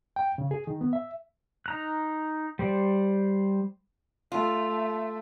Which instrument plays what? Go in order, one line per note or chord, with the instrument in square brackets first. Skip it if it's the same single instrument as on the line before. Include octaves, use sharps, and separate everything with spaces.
[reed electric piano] G5
C#3
G#4
D#3
B3
E5
[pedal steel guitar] D#4 A#5 F#6
G3 C5 D5
[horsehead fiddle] A3 [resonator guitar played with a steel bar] F4